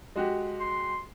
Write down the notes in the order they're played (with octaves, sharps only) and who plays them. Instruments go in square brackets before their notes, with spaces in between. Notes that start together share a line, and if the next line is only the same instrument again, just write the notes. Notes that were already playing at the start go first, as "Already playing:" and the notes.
[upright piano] G#3 F#4 G4
[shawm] C6